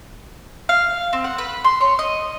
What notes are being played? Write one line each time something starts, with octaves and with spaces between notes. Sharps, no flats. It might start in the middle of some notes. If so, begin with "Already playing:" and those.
F5
C4
F#5
B4
C6
C#5
D#5